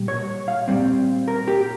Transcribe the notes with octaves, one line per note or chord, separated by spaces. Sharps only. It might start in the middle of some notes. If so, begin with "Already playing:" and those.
Already playing: A#2 G3
C#5
F5
A#2 G3 C4
A#4
G4